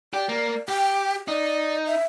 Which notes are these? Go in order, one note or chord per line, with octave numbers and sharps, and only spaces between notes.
G4 D5
A#3
G4 G5
D#4 D5
E5